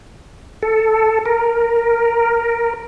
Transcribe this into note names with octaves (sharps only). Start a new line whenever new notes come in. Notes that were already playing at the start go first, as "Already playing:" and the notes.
A4
A#4